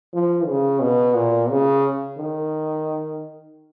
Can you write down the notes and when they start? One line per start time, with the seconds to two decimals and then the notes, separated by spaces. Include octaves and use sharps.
0.13 F3
0.47 C#3
0.81 B2
1.15 A#2
1.50 C#3
2.18 D#3